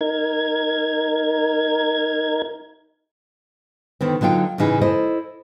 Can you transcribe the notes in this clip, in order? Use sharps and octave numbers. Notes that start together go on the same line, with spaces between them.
D#4 A#4 G#6
D3 D#3 B3 C4
D3 F#3 D#4 F4 G5
A2 C#3 E3 D#4 G#4
E4 A4 C5 D#5